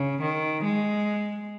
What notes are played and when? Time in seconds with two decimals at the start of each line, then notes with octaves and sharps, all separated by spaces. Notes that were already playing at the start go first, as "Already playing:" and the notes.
Already playing: C#3
0.22 D#3
0.64 G#3